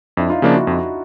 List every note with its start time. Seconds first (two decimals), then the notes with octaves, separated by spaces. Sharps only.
0.17 F2 D4 E4
0.30 D#4 F4
0.42 C#3 F3 A#3 D4 D#4 F4
0.55 E4 F#4
0.67 F2